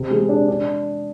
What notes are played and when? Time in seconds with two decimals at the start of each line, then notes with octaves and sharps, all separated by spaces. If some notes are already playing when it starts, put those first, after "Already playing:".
Already playing: C3
0.11 G#3
0.29 D4
0.48 D4